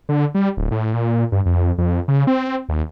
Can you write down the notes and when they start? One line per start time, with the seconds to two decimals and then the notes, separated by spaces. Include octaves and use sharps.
0.09 D3
0.35 G3
0.57 D1
0.72 A2
0.94 A#2
1.32 G2
1.46 F2
1.78 F2
2.08 C#3
2.27 C4
2.69 D#2